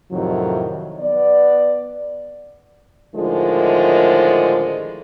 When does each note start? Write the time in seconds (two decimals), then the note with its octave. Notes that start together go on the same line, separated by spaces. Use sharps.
0.12 F2 A2 C3 D#3 F#3
1.00 B3 D5
3.15 A2 D3 D#3 F3 G#3 A3